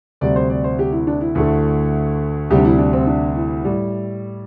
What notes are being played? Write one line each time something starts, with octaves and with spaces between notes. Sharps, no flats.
D2 C3 G3 D5
C5
D5
C5
G4
E4
D4
E4
D2 D3 A3
D2 C3 G3 G4
D4
E4
D4
C4
D4
E4
A2 G3